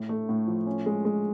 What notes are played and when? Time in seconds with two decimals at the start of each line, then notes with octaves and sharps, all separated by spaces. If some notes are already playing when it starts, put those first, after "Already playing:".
Already playing: A2
0.09 A3
0.29 A2
0.48 F3
0.67 C#4
0.86 G#3
1.05 G#3